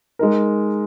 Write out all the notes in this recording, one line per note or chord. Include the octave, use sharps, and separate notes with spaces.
G#3 D#4 A#4